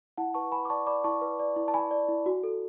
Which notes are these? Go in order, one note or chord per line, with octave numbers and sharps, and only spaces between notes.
E4 F#5 A5
B4 A5 C#6
B4 G#5 B5
D6
D5 A5 C#6
D5 B5 D6
E4 A5 C#6
B4
D5
E4
A5
E4 G#5 B5
D5
E4
F#4
A4